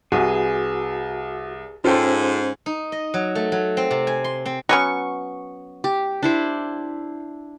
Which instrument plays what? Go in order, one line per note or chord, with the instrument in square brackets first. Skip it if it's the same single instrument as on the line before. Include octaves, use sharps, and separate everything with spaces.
[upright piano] C2 [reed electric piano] F#4 [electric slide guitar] G#4 B4 G#5
[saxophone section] G#2 [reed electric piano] C#4 C5 [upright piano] F4 A4 G5
[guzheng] D#4
D#5
F#3
A3
F#3
C4
C3
G#5
C6
C4
[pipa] F#3 B3 C#4 [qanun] C#6
[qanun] G4
D4 E4 C5